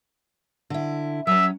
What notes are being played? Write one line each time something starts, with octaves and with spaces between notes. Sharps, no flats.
D3 E4
F#3 C#4 E5 E6